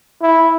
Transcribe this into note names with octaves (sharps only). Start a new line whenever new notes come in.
E4